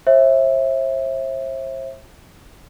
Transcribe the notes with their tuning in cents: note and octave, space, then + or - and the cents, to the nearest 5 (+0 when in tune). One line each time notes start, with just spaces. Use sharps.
C5 +40 E5 +0